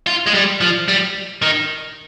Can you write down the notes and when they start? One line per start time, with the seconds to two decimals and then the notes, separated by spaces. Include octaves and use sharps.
0.07 F4
0.26 G#3
0.34 G3
0.61 F3
0.88 G3
1.42 D#3